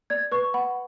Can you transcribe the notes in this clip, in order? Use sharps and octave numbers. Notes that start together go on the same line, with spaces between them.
D5 G#6
B4 C#6
F#5 B5